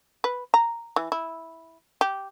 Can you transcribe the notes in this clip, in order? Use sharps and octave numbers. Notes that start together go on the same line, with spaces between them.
B4
A#5
E3
E4
G4